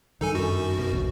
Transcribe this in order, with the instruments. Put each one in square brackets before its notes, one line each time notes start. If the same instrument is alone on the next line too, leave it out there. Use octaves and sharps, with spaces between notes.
[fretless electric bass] G2 D#3 [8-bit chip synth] D#4 A4 G#5
[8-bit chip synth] F#2 F#4
[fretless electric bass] B2
A#1 D#2